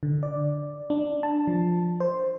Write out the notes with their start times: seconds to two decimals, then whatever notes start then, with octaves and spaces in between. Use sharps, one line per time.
0.03 D3
0.23 D5
0.90 D4
1.23 A5
1.47 F3
2.00 C5